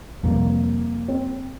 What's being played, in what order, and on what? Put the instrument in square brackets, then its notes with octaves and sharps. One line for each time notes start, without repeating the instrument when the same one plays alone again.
[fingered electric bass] F2 C3 G3 [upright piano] A#3
[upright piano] C4